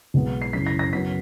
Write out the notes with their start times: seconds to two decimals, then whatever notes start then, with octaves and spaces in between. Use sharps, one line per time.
0.14 B1 B2 G#3 B3
0.42 C7
0.53 F#2 C#3 E3 B6
0.67 A#6
0.79 A#6
0.93 F#2 C#3 F#3 B3 B6